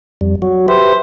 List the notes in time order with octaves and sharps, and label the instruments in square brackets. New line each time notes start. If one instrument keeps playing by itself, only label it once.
[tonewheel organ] F2 G3
F#3 F#4
[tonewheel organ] G4 B4 E5 [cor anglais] C5